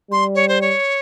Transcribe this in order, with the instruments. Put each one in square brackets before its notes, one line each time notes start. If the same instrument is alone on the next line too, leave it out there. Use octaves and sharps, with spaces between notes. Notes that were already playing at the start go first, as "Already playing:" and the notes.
[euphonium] G3 [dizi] C6
[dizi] C#5
C5
C#5